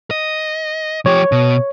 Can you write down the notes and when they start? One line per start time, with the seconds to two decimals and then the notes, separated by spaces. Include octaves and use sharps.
0.11 D#5
1.06 F3 G4 C#5
1.32 B2